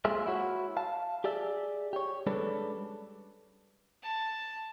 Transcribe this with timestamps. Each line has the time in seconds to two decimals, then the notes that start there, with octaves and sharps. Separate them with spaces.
0.05 G#3 A#3 C4 F4 G#4 E5
0.26 E4 F#4 C#5
0.77 F5 A5
1.24 G4 G#4 D5 E5
1.93 G4 C#5
2.27 G3 G#3 C#4 D4 A4 B4
4.02 A5